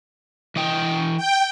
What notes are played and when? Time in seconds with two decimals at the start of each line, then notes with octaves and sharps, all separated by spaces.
0.56 E3 D#5 G5
1.17 G5